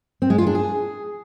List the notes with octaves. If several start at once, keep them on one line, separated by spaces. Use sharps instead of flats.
C4
G#3
F4
D4
G#4